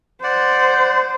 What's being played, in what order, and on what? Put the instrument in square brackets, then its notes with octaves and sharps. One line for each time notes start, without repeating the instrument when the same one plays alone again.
[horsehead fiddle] C5 [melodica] D5 F#5